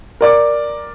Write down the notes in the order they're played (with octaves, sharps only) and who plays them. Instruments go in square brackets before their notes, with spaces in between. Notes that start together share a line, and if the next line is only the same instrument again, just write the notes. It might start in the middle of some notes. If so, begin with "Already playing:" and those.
[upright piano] A#4 D5 D6